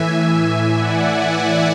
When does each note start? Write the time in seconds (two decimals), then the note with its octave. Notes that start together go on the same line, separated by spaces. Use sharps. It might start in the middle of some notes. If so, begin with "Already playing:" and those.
Already playing: A2 E3 E5 G#5
0.74 D5 F#5
1.03 E5 G#5